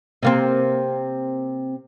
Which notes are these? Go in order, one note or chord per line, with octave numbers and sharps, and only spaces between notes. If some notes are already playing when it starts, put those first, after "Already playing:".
C3 A#3 C4